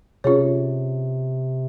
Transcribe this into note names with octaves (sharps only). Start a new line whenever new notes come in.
C3 C#4 F4 G#4 C#5